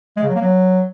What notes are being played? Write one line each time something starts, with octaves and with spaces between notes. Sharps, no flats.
G#3
C#3
F#3
A#3
F#3